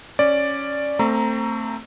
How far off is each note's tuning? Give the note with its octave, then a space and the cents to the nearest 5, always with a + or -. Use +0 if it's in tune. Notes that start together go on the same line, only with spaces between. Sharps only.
C#4 +0 D5 +0
A3 +25 C4 +0 A#5 +0